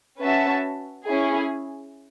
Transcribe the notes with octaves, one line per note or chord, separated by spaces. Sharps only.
C#4 F#4 B4 E5 A5
C#4 E4 G#4